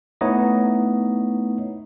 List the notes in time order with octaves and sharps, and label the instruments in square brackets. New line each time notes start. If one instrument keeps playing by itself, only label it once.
[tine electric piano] A3 B3 D#4 E4 C#5 D#5